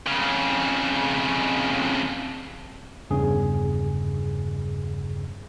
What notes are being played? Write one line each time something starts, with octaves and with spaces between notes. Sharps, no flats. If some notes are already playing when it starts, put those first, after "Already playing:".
F2 C#3
E2 G2 C#3 G#4